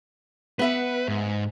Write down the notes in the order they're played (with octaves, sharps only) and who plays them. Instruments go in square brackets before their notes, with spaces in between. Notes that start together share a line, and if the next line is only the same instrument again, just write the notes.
[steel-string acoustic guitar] B3 E5 F#5 [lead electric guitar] B4
[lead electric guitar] G#2